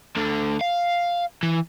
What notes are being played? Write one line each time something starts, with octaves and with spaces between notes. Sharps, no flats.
D2 D3
F5
E3